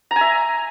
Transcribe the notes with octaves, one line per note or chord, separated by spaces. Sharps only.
A#5
G#5
E5